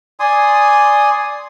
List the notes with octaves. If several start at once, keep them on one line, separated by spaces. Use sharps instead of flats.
D5 G#5 C6 D#6